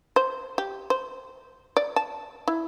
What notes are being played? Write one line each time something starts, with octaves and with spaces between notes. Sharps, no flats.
C5
G4
C5
D5
A5
E4